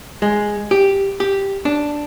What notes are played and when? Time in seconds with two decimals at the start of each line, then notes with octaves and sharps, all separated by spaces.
0.22 G#3
0.71 G4
1.20 G4
1.65 D4